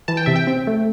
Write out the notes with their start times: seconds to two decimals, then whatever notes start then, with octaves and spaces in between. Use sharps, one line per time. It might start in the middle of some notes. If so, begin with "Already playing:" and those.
0.08 E3 A5
0.17 G5
0.26 C3 E5
0.36 G5
0.47 C4
0.67 A3